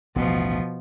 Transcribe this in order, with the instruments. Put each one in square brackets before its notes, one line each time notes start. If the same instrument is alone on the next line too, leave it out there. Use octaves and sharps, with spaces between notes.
[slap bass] A1 D#2 [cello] B2 F3